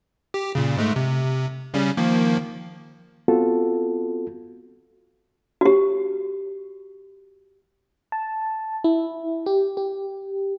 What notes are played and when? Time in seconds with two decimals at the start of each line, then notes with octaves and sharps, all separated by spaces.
0.34 G4
0.55 A#2 C#3
0.77 G#2 G#3 A3
0.96 C3
1.74 C#3 G3 C#4
1.97 D#3 F3 A#3
3.28 B3 C4 F4 F#4 A4
5.61 F#4 G4
8.12 A5
8.84 E4
9.46 G4
9.77 G4